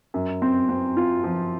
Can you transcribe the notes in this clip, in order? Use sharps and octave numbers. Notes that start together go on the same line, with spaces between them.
F#2
C4
C4
F4
F3